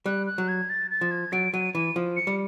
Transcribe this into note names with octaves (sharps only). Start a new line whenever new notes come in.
G3 F#6
F#6
F#3
G#6
A6
A6
F3
G#6
F#3 D7
F#3 D#7
E3 D#7
F3
C#7
G3